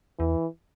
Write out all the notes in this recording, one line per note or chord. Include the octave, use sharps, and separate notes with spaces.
E2 E3